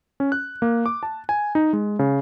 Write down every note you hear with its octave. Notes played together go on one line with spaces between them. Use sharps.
C#4
F#6
A#3
D6
A5
G#5
D#4
G#3
C#3